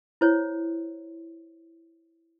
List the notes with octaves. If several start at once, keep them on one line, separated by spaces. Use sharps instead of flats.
E4 C5 C#5